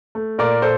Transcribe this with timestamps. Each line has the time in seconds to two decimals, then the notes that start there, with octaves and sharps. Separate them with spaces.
0.15 A3
0.38 A#2 A#4 D5
0.62 A#2 A4 C5